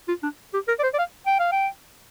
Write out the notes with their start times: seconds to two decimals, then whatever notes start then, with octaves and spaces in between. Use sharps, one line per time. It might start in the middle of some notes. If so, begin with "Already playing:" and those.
0.08 F4
0.23 D4
0.54 G4
0.68 A#4
0.79 D5
0.83 C5
0.94 D5
0.99 F5
1.27 G5
1.39 F5
1.52 G5